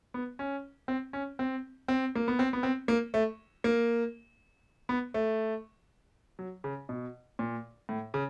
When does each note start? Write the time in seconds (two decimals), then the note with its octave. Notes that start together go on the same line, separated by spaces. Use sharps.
0.14 B3
0.39 C#4
0.88 C4
1.13 C#4
1.39 C4
1.88 C4
2.15 A#3
2.28 B3
2.39 C4
2.53 B3
2.63 C4
2.88 A#3
3.14 A3
3.64 A#3
4.89 B3
5.14 A3
6.39 F#3
6.64 C#3
6.89 B2
7.39 A#2
7.89 A2
8.14 C#3